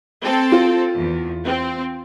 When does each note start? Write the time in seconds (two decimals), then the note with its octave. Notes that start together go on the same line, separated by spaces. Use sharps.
0.22 C4 A4
0.52 F4
0.96 E2
1.45 C4